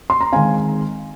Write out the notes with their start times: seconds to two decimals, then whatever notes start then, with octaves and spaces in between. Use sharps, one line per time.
0.10 C6
0.21 A#5
0.33 D#3 G#3 C4 F5 G#5